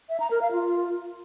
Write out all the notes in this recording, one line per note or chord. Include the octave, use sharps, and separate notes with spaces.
E5
A#5
A#4
F5
F4